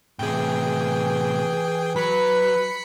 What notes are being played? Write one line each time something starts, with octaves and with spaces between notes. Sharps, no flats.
A2 C3 E3 G#4 G5
F#3 B4 B5 B6 C#7